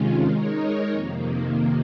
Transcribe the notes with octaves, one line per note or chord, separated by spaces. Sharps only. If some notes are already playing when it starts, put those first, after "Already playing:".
Already playing: C3 D#3 G#3 C#4 F4
G#3 D#4 A#4 C#5
F2 C3 D#3 A#3